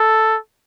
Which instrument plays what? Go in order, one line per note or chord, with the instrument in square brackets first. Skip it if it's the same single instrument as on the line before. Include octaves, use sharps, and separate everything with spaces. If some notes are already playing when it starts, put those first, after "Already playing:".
Already playing: [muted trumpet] A4